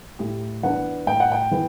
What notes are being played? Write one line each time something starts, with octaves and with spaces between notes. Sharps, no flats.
A2 G4
E3 B3 D4 F#5
A2 G5
F#5
G5
E3 B3